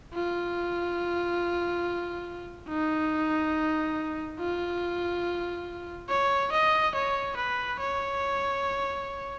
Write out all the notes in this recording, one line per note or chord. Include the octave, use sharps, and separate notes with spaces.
F4
D#4
F4
C#5
D#5
C#5
B4
C#5